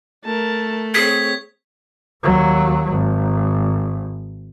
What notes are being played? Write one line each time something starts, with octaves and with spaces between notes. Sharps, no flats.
A3 A#4 A5
C4 G#4 C#5 G#6 B6
D#2 F#3
G#1